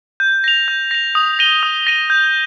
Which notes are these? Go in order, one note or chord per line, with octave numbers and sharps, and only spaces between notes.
G6
A#6 F7
G6
A#6 F7
D#6
A#6 D#7 G7
D#6
A#6 D#7 G7
G6